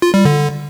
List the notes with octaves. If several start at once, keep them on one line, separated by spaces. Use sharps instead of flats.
F4
G3
D3